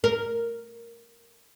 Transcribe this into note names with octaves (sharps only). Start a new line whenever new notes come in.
A#4